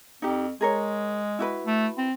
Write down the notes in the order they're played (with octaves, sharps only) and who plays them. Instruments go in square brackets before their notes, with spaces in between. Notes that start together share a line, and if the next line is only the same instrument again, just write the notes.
[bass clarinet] F2 [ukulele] D#4 G4
[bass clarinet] G#3 [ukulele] G#4 A#4 C#5
[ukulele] E4 F#4 B4
[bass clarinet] A3
C4